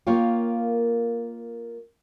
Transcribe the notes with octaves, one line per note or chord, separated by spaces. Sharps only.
A#3 F4 A#4 C#5 F5 G5